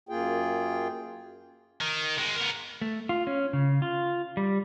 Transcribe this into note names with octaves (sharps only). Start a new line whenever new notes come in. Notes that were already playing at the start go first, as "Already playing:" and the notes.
F#2 A#3 F4 G#4 G5
D#3
G#3 C4
B3 A#4
A3
F4
C#4
C#3
F4
G3